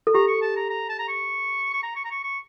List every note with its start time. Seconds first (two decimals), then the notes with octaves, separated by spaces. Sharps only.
0.07 A4
0.14 G4 A#5
0.28 C#6
0.42 A5
0.56 A#5
0.70 A#5
0.89 A5
0.99 A#5
1.08 C#6
1.73 C#6
1.83 A#5
1.96 C#6
2.04 A#5
2.11 C#6
2.24 C#6